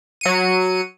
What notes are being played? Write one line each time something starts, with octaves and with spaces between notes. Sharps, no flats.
F#3 C#7 D#7